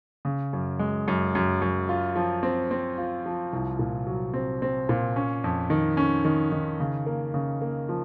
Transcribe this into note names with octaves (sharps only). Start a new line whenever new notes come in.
C#3
F#2
G#3
F#2
F#2
F#2
F4
F3
C4
C4
F4
F3
C2
A#2
F#3
C4
C4
A#2
C#4
F2
D#3
C#4
D#3
D#3
C#3
A#3
C#3
A#3
F3